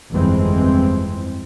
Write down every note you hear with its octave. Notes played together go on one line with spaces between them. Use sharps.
G1 F2 E3 G#3 C4